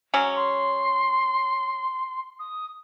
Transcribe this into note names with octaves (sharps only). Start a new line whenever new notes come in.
F#3 G#3 C#4
C6
D#6